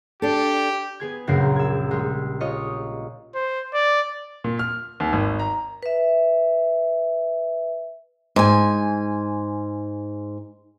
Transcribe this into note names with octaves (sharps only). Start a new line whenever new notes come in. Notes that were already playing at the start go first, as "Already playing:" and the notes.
D4 G4 A4
B3 G#4 G#6
A#1 F#2 C#3 A#4 C7
E6 G#6
G3 G#3
F4 C#5 D#5
C5
D5
A#2
F6
D#2
G#1
A#5
B4 E5
G#2 G#5